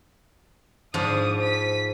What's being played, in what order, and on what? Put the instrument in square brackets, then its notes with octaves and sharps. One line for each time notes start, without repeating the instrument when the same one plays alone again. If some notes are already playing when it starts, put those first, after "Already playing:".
[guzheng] G#2 F3 [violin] D4 D#6
[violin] B6 D#7